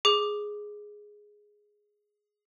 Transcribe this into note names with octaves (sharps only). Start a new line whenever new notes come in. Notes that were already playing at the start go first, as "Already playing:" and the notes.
G#4 D6